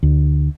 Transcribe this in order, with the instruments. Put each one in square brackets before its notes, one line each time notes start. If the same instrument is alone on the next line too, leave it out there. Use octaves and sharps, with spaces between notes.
[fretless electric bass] D2